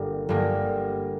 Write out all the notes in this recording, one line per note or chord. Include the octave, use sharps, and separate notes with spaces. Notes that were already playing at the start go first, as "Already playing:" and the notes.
Already playing: G1 G2 G3 A#3
G1 G2 G3 A#3